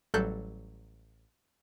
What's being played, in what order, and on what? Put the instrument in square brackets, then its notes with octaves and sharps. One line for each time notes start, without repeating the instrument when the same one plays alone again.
[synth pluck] A1 F#3 G3 A4 F#6 G6